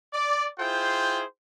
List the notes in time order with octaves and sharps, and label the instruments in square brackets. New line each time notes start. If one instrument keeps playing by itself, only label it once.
[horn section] D5
E4 F4 G#4 C5 G5